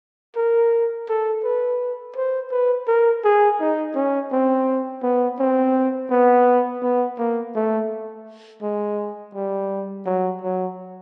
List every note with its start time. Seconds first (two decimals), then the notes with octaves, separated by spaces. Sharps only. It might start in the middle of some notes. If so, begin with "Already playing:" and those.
0.36 A#4
1.09 A4
1.44 B4
2.16 C5
2.52 B4
2.88 A#4
3.25 G#4
3.61 D#4
3.95 C#4
4.32 C4
5.03 B3
5.39 C4
6.11 B3
6.83 B3
7.18 A#3
7.55 A3
8.62 G#3
9.35 G3
10.06 F#3
10.42 F#3